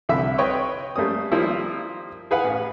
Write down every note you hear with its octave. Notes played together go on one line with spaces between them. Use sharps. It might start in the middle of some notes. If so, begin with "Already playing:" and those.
C2 D3 E5 E6
B4 C#5 D#5 G5 C6 C#6
G3 A3 A#3 C#4 D#6
D#3 F3 G3 A#3 E4
G#4 B4 F5 F#5 G#5
A1